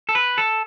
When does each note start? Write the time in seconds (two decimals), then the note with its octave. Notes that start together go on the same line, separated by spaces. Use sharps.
0.09 A4
0.15 B4
0.38 A4